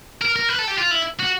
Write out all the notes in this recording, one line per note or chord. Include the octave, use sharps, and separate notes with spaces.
A#4
A#4
B4
A4
G4
F4
E4
F#4